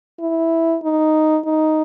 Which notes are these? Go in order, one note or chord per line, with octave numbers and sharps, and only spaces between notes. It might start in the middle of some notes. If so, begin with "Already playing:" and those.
E4
D#4
D#4